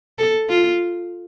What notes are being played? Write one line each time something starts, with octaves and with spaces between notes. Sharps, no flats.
A4
F4